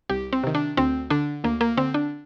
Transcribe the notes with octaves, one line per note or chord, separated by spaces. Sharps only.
C2 G4
C4
C3 D#3
D4
D2 C4
D3 D4
D2 A#3
A#3
D3 C4
D4